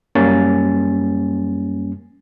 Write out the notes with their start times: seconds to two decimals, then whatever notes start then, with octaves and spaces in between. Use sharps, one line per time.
0.15 F#2 G3 A#3 C#4 G#5 A6